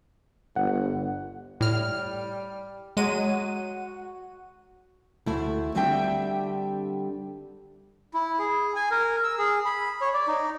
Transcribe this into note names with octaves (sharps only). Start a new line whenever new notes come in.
G1 F#5
A2 G3 F6
F#3 G#3 D#7
F#4
D2 A3 E4
D3 G3 C4 D4 E5 G5
E4
G#4
G#5
A#4
E6
G#4
B5
C#5
D5
D#4